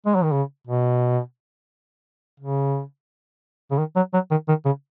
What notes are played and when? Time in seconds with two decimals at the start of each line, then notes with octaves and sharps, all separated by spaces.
0.06 G#3
0.15 F#3
0.24 D#3
0.32 C#3
0.67 B2
2.40 C#3
3.71 C#3
3.79 D#3
3.96 F#3
4.14 F#3
4.31 D#3
4.49 D#3
4.66 C#3